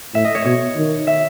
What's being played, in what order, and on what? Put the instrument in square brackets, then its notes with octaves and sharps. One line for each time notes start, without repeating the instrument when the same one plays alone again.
[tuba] A2 [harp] E5
[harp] D#5
C#5
[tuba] B2 [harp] C#5
[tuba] D#3
[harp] E5